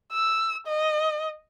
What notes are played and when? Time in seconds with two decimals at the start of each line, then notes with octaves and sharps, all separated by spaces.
0.13 E6
0.67 D#5